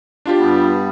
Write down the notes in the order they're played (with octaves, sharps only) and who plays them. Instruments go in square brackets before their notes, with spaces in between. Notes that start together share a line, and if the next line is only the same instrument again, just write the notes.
[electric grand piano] D4 F4 G4
[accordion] G2 G3 B3